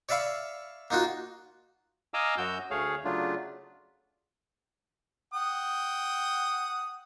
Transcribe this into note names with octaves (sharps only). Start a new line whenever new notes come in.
C#5 D5 E5 F5 B5 C#6
A#3 D#4 F4 F#4
D#5 F5 G#5 A#5 D6 E6
F#2 F#4 E6 G6
D2 A3 G#4 C#5 F5
C#3 F#3 A3 D4 F4
F#5 G5 D#6